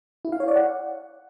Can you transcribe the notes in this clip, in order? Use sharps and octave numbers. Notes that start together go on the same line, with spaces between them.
E4
F5
C#5
D5
F#5